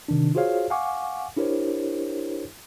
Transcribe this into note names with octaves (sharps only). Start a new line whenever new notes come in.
C3 D#3 D4
F4 F#4 G#4 C5 C#5 F5
F5 F#5 G#5 C#6 D6
D4 E4 G4 A#4 C5 C#5